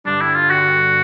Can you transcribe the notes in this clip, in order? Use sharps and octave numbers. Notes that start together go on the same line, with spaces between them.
G2 D3 G3 D4
E4
F4
G2 D3 G3 F#4